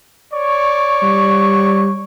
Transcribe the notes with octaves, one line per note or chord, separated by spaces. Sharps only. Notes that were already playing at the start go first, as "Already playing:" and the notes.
C#5 D5 C#6
G3